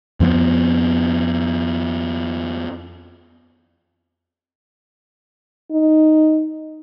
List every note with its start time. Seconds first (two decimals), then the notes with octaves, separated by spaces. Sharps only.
0.20 F2 F3 A#3 B3
5.71 D#4